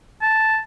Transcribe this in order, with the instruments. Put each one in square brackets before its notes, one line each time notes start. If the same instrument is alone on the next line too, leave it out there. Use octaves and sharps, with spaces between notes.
[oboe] A5